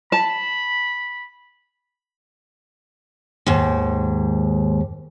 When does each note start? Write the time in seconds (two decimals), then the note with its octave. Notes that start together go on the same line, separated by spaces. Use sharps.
0.12 A5 B5
3.46 D#2 G#2